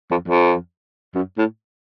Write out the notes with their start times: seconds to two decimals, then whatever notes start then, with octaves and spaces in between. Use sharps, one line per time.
0.11 F2
0.28 F2
1.15 F#2
1.38 A2